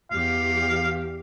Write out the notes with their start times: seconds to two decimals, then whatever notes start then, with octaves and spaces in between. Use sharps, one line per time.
0.11 E2 G4 F5